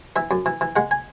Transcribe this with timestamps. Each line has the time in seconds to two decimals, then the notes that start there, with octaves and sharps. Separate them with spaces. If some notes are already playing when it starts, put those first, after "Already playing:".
0.16 E3 E5
0.31 F#2
0.46 E3
0.61 E3
0.76 G#3 F#5
0.91 G#5